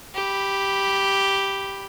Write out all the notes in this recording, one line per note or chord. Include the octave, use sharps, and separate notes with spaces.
G4 B5